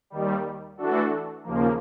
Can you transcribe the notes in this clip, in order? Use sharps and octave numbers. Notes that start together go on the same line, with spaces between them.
D#2 D#3 G3
E3 A3 D4 F#4 A4
D#2 C#3 F3 A#3